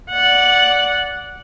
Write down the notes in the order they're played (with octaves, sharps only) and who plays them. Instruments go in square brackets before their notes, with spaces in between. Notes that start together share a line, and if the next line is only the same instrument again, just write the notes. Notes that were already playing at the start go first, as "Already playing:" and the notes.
[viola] D5 F#5